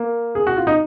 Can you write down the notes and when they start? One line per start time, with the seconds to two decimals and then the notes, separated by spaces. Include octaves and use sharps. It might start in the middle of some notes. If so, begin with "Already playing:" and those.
Already playing: A#3
0.35 G#4
0.47 F#4
0.57 F4
0.67 D#4